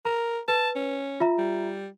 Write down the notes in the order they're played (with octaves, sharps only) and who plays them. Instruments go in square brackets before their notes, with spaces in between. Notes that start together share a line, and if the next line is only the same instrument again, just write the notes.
[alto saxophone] A#4 [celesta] A#5
[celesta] B4 [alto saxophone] A5
[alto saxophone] C#4
[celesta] F4 E5 A#5
[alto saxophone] G3